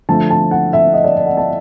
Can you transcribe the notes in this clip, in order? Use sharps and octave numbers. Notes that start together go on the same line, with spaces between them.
D3 F3 A3 A5
A5
F#5
E5
D#5
D5
D5
F#5
A5